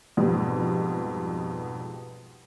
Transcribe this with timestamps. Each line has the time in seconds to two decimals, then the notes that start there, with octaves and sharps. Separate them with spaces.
0.17 F2 G#2 B2 G3 B3